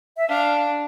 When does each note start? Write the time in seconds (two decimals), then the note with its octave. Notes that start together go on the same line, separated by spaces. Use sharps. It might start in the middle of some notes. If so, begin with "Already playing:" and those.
0.17 E5
0.28 D4 F5